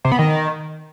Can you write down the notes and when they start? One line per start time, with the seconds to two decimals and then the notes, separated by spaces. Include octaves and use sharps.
0.05 C3
0.12 B3
0.19 D#3